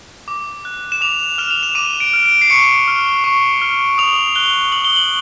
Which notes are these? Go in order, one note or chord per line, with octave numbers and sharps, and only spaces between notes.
D6
F#6
E7
D6 F7
F6 E7
F7
E7
D6 D#7
D7
F6
D7
C7
C#6 C#7
F6
C#6
F6
D#6 F7
F#6 G7
D#6 F#7
G7
F#7